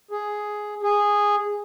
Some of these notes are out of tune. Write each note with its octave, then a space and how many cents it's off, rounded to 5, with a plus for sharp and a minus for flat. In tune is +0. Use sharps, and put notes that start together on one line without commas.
G#4 +5
G#4 -10